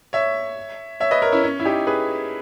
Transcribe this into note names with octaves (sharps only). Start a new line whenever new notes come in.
C#5 E5
C#5 E5
B4 D#5
A#4 C#5
C#4 E4
C#4
E4
D#4 G4
G#4 B4